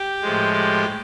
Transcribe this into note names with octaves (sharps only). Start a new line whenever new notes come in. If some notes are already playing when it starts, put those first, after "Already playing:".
Already playing: G4
A2 F3 G#3
G4